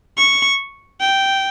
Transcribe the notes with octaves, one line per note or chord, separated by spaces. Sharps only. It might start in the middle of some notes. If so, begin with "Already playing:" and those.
C#6
G5